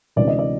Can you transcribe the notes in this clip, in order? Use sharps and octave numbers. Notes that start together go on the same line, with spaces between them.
D2 C3 E3 G#3 C#4 D5
D#5
D5